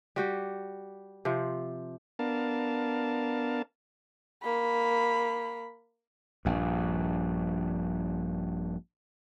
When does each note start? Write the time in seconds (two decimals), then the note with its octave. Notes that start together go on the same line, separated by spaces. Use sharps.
0.16 G3 F#4 G4
1.25 C3 F3
2.19 B3 D4 A#4 F5 A5
4.43 A#3 B5
6.45 A#1 G2